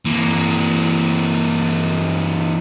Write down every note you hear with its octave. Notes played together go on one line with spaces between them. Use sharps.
E3 A#3